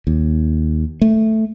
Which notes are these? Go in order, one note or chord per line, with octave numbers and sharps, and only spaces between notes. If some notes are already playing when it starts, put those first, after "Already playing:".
D#2
A3